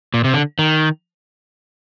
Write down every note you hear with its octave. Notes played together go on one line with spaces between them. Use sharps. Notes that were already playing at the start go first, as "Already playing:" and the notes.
A#2
C3
D3
D#3